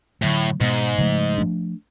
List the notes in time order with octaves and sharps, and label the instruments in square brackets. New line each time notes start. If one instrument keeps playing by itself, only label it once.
[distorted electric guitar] A2 [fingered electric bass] D3 F#3 A3
[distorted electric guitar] G#2 [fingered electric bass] B2 G#3 B3
[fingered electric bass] C#3 F3 A3
F3 A3 D4